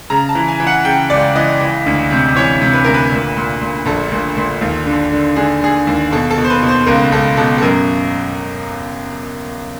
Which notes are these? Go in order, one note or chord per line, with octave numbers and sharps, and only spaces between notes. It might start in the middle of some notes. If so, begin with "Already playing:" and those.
C#3 A#5
A5
E3
G#5
E3
F#5
C#3 G5
C#2 D5
E3 D#5
E3
D2
C3
E3 C#5
C3
B4
D2 A#4
B4
A#2
A#2
A#2
A#1 A4
A#2
A#2
D#2
D3
D3
D3 G#4
D3 G#4
D#2
B2 A4
A4
B2
C5
B4
B2
C5
C#2 A#4
C#2 A4
B2 A4
A4
F#2 A#4